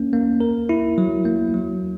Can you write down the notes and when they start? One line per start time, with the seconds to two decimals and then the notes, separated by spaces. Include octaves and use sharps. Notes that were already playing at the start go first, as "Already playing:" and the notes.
Already playing: A#3 C#4
0.13 A#3
0.40 A#4
0.69 E4
0.98 F#3
1.26 A#3
1.54 F#3